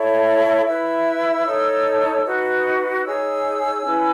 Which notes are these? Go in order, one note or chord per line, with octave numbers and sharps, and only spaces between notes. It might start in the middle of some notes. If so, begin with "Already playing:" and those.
Already playing: E4 A4 C#5
E4 B4 E6
D#4 A4 C#5
D#4 F#4 B4
D#4 G#4 C#5 E6
C#4 E4 B4